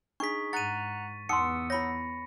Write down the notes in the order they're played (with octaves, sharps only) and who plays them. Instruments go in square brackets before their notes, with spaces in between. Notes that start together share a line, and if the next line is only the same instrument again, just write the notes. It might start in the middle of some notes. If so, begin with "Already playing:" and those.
[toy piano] D4 [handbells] D#4 G#4 [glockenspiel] C#6 B6
[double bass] G#2 [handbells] F#5 A#5 F#6 [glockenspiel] A6 D#7
[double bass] E2 B3 [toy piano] D#4 C6 [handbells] F#5 D#6 E6 [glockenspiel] C#7
[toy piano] E4 C#5 [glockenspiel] B5 A#6